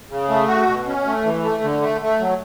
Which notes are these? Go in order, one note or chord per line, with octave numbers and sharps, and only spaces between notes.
C#3
A3
F#4
B2
C#4
A3
E3
A3
D3
A3
A3
F#3